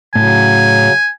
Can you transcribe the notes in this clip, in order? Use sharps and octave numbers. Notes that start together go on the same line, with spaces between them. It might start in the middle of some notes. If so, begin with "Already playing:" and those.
A2 C#3 F#3 G#5